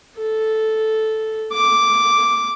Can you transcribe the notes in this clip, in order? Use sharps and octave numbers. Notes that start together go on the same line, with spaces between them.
A4
D6